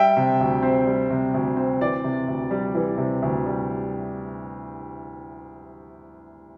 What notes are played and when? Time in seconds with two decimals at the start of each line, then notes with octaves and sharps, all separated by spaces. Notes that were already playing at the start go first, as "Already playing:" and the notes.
Already playing: G3 E5 G5
0.17 C3
0.40 D2
0.63 C4
0.87 G3
1.10 C3
1.34 D2
1.57 C4
1.81 E3 D5
2.04 C3
2.28 D2
2.51 G3
2.74 E3
2.98 C3
3.22 D2
3.46 G3